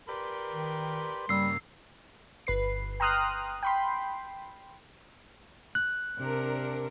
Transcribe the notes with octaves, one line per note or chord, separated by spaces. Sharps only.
G4 A#4 B4 D5 C6
D#3
G2 C#3 G3 A#3 E6 C7
G1 B4 C7
G5 A#5 C6 D#6 F6 F#6
G5 B5 C6
F#6
C3 D4 A#4